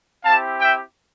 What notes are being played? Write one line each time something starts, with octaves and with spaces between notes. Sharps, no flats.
C4 E4 G4 F5 A5
E5 G5